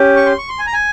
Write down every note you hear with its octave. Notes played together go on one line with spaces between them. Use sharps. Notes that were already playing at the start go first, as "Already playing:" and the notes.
Already playing: C#4 G4
C#6
C6
C#6
C6
G#5
A#5
G#5